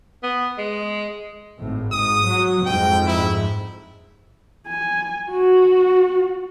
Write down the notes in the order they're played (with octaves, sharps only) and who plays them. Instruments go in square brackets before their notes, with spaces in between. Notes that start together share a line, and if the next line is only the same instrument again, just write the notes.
[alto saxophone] B3
G#3
[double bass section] G#1 A2
[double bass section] G#2 [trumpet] D#6
[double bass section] F#3
[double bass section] F2 G#2 [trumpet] G5
[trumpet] E4
[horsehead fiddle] G#5
F#4